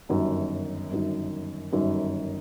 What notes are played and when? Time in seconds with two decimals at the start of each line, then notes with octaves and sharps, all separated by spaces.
0.09 G1 F#2 D#3
0.91 G1 F#2 D#3
1.73 G1 F#2 D#3